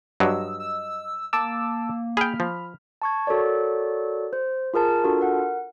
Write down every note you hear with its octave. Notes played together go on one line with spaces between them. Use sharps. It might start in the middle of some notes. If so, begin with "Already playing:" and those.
G2 F#3 D#5 E6
E6
A#3 A5 D6 E6
G#4 G5 B5 F6
F3
A5 C#6 G#6
F#4 A4 A#4 C#5 D5
C5
F4 G#4 A#4 A5
D4 F4 F#4 A4 A#4
A#4 F#5